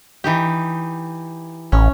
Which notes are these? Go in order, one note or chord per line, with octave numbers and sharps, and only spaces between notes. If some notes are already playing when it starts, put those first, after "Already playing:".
E3 D#4 G4
A1 C#4